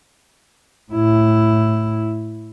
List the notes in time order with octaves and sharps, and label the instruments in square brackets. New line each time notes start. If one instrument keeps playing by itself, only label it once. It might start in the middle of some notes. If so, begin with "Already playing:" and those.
[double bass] A2 E4